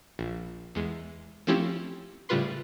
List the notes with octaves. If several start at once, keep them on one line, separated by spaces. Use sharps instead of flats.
A#1
E2 G#3
F3 A3 C4 C#4 E4 G4
A2 C#3 G3 F4 B4 C6